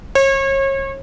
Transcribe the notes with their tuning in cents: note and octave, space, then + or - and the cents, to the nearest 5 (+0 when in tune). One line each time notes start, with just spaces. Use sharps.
C#5 -35